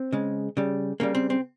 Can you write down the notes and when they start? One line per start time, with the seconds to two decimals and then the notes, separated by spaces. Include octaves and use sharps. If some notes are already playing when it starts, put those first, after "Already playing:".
Already playing: C4
0.12 C#3 G#3
0.57 C#3 G3
1.00 C#3 G3 A#3
1.15 C4
1.30 C4